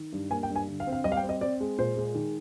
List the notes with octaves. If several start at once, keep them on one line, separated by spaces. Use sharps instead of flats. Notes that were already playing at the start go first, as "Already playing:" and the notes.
Already playing: D#3
G2
A#3 G#5
G5
G2
G#5
D3
F5
C4
F5
G3 D#5
F5
G5
C4
D#5
C4 D5
G#3
A#2 C5
G#3
D#3